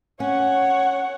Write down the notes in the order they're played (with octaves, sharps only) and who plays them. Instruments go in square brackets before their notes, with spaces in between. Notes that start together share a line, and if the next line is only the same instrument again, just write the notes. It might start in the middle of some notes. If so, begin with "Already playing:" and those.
[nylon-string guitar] C#4 [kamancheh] C#5 F#5